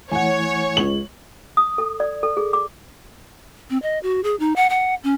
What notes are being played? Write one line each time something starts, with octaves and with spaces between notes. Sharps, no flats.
E3 A3 E4 C#5 F#5 G#5
C#2 F#7
D#6
A4
D5
A4
G#4
D6
C4
D#5
F#4
G#4
D#4
F#5
F#5
C#4